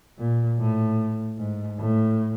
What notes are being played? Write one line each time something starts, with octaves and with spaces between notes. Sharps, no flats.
A#2
A2
G#2
A2